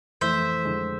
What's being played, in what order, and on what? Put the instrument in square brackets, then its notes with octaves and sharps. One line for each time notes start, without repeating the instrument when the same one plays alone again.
[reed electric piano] F2 E3 A3 E4 [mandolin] C5 E5
[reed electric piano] F2 D3 G#3